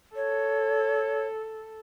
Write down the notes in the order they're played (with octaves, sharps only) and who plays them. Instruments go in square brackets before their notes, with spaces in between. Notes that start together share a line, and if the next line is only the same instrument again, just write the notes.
[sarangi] A4 [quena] C#5